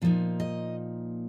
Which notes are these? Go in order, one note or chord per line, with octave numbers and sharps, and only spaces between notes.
A#2 F3 A#3 D#4
D#5